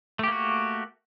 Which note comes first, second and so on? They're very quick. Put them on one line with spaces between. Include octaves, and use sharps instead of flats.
A3 G4 A#3 F#4